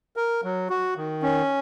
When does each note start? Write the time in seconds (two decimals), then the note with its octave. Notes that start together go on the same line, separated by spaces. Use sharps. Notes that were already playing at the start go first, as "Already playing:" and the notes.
0.16 A#4
0.44 F#3
0.70 F#4
0.97 D#3
1.23 C#4